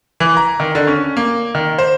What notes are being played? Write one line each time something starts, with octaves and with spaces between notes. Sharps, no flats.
E3
A#5
D#3
D3
C#4
A#3
D#3
C5